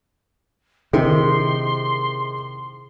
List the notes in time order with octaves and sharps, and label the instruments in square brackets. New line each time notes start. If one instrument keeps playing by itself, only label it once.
[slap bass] C3 [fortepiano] D#3 E4 [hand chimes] G#4 [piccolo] C6